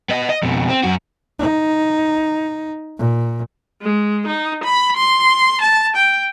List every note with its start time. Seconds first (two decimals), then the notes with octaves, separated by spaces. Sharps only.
0.09 B3 D#5
0.29 D#5
0.43 F2 B2
0.69 C4
0.83 F#2 F#4
1.39 D#4
2.98 A#2
3.82 G#3
4.27 D#4
4.64 B5
4.97 C6
5.62 A5
5.96 G5